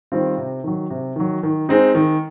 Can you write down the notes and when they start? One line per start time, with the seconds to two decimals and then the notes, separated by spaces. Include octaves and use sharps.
0.12 D#3 G3 C4 F4
0.38 C3
0.64 D#3 F#3
0.90 C3
1.16 D#3 F#3
1.43 D#3
1.69 G#3 C4 D#4
1.95 D#3